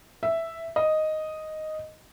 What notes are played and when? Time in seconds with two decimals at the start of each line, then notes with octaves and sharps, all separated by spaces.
0.23 E5
0.76 D#5